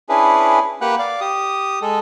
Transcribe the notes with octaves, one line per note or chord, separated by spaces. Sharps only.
C#4 D4 E4 G#4 B4
A#3 G4 B4 F#5 G5 F#6
D5 F5
G4 D#6
G#3 A4